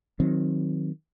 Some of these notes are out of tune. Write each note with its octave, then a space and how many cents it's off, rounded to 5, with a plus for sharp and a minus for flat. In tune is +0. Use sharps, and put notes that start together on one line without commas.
D#3 +0 F#3 -15 C4 +5